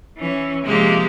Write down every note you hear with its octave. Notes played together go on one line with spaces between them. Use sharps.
E3 C#4
C3 F3 G#3 A#3 G4